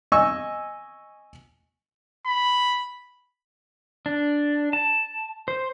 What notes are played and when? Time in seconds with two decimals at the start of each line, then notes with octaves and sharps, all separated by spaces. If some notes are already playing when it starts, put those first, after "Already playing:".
0.12 D#5 G#5 C#6 E6
2.26 B5
4.06 D4
4.73 A5
5.48 C5